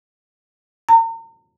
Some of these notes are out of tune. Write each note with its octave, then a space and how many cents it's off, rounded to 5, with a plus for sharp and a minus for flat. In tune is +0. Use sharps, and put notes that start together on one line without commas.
A#5 -40